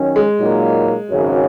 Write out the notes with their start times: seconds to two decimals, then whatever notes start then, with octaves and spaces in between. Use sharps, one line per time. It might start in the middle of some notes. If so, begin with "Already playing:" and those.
Already playing: D#3 F#3 C#4
0.16 G#3
0.39 A#2 F#3 A#3 D#4
1.09 G#1 F#2 C#3 F#3